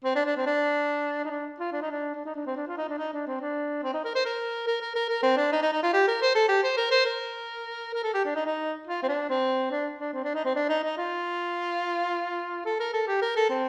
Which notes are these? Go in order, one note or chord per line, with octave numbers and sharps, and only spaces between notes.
C4
D4
D4
C4
D4
D#4
D4
F4
D4
D#4
D4
D4
D#4
D4
C4
D4
F4
D#4
D4
D#4
D4
C4
D4
C4
D#4
A#4
C5
A#4
A#4
A#4
A#4
A#4
C4
D4
D#4
D#4
D#4
F4
G4
A#4
C5
A4
G4
C5
A#4
C5
A#4
A#4
A4
G4
D4
D#4
D#4
F4
C4
D4
C4
D4
D4
C4
D4
D#4
C4
D4
D#4
D#4
F4
A4
A#4
A4
G4
A#4
A4
C4